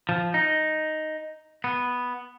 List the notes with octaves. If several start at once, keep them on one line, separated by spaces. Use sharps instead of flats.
F3
D#4
B3